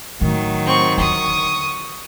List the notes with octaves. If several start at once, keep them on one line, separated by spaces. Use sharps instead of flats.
A2 D#3 F#3
C4 C#6
D#2 D3 C#6 D#6